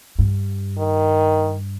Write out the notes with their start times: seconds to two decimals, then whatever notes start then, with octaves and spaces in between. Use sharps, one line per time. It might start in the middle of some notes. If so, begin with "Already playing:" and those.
0.19 G2
0.78 D#3